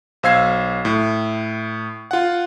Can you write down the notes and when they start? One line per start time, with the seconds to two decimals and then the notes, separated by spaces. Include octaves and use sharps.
0.23 B1 C5 F5 E6 G#6 C7
0.85 A2
2.11 F4 F#5